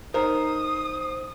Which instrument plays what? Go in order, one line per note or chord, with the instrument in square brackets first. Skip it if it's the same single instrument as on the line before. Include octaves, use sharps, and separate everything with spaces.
[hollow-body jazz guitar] D#4 A#4 [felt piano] C5 [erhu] D#6